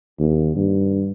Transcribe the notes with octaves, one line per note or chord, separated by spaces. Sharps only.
D#2
G2